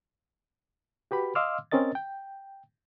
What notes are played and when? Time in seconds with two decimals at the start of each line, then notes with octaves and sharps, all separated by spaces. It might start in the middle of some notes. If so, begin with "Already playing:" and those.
1.11 F#4 G4 B4 B5
1.35 D#5 F5 C6 D6 E6 F6
1.72 C4 C#4 A#4 D#5 A6
1.95 G5